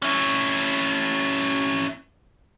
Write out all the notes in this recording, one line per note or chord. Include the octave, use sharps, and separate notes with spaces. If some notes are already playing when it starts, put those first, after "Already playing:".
C#4 E4